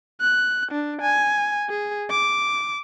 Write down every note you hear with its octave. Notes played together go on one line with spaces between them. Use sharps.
F#6
D4
G#5
G#4
D6